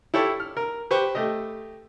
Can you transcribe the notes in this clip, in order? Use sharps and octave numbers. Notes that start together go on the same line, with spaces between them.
E4 G4 A4 C#5 A5
F6
A#4
G4 B4 C5 C#6
A3 G4 D#5